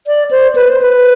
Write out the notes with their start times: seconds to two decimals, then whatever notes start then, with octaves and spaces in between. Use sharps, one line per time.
0.07 D5
0.31 C5
0.55 B4
0.69 C5
0.81 B4